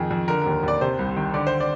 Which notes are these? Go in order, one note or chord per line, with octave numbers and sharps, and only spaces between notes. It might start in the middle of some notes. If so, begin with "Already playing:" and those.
Already playing: F2 D#3 G#4
F2
D3 A#4
D#2 A#4
D#2 D5
C3 C5
C2
D#3
D3 D5
C5
D5